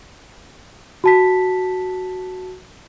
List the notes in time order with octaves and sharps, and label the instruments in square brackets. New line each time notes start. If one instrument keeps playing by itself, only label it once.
[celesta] F#4 A5 B6